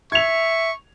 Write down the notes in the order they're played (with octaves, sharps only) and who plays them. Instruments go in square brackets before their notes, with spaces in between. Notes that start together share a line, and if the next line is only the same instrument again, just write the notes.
[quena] E5 [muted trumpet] C#6 [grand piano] G#6 F7